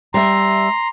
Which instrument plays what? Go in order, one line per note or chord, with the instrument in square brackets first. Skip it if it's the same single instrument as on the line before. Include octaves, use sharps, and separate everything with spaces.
[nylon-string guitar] G3 E5 [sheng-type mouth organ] A#5 C6